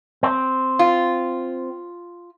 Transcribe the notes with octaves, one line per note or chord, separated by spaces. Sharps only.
C4
F4